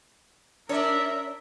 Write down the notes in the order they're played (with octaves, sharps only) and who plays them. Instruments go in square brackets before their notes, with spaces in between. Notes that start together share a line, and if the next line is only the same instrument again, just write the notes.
[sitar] C#4 D5 [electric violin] A#4 E5 [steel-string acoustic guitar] C#5